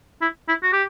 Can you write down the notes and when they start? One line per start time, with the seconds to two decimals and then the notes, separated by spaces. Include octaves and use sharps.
0.22 E4
0.49 E4
0.63 F#4
0.73 G4